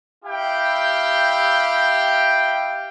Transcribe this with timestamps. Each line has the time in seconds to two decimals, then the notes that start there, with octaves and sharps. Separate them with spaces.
0.25 E4 G4 F5 G5